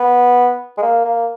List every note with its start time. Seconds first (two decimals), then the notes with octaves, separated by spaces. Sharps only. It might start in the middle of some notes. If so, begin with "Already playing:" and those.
Already playing: B3
0.78 G#3
0.82 A#3
1.05 A#3